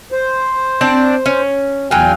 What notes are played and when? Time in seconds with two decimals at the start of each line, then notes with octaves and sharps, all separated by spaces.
0.12 C5
0.81 C4 D4 D5
1.26 C#4
1.91 E2 F#3 F4 G5 G#5